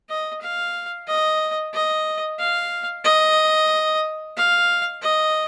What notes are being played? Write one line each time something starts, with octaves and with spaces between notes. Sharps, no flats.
D#5
F5
D#5
D#5
F5
D#5
F5
D#5